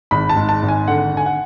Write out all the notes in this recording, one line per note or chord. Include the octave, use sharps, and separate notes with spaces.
G#1 B5
A5
G#2
A5
G#1
G#5
D3 F#5
D3 G#5
F#5